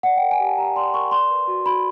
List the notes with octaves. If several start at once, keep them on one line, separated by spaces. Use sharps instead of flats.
D5 F#5
G5
A#4
G#5
G4 A5
G4 A#5
D5 C6
A#4 C#6
D5 C6
B4
F#4
F#4 B5